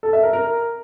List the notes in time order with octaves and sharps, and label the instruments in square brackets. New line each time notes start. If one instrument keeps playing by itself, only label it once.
[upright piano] A4
E5
A#4
A#4